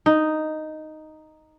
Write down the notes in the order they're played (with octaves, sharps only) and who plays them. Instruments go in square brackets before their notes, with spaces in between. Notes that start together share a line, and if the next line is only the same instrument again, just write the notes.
[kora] D#4